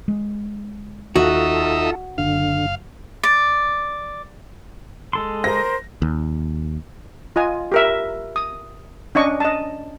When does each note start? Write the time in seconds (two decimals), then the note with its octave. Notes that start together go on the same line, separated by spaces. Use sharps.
0.08 G#3
1.16 D#2 D#4 F4 F#4 A4 E5
2.18 F#1 D3 F5
3.23 D5
5.13 G#3 A4 C6
5.44 A#4 C5 A#6
6.02 D#2
7.36 F4 D#5 G#5
7.72 G4 A#4 E5
8.36 D#6
9.15 C#4 D4 D#5 C#6
9.40 D#5 A5